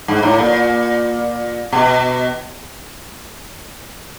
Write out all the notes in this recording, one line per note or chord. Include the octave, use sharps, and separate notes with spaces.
G#2
A2
A#2
B2